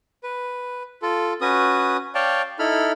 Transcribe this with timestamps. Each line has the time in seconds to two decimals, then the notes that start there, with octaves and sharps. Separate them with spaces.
0.23 B4
1.02 F4 A4
1.41 C#4 F#4 B4 D#6
2.15 C#5 D5 F5 G5 A5
2.59 D#4 E4 A4 B5 F6